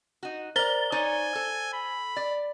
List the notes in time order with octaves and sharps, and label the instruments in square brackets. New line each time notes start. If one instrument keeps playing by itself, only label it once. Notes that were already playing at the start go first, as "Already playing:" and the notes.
[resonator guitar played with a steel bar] D#4 F#4
[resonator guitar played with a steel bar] A#4 D5 [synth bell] C5 A6 G7
[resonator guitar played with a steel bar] D#4 C#5 D5 [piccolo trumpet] G#5
[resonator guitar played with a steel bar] A4
[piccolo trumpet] B5
[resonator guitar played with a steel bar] D5